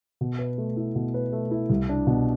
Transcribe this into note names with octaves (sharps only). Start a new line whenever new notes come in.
B2
B4
A3
E4
B2
B4
A3
E4
C2
D4
B2